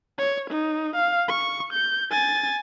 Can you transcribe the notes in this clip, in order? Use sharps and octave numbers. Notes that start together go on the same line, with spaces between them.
C#5
D#4
F5
C#6
G6
G#5 A6